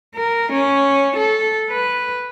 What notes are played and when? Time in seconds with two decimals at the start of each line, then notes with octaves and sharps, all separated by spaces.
0.15 A#4
0.52 C#4
1.16 A4
1.70 B4